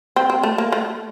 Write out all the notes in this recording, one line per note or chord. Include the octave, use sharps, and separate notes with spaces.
C4
C4
A3
A#3
A3